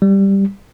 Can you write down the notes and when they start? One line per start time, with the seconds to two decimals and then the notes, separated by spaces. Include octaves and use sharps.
0.02 G3